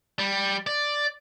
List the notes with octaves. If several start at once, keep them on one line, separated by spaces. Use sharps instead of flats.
G3
D5